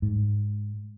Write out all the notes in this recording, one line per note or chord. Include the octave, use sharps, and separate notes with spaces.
G#2